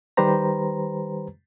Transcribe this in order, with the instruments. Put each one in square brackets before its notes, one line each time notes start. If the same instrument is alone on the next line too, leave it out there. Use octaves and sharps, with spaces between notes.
[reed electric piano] D#3 G3 G4 B4 C5 A#5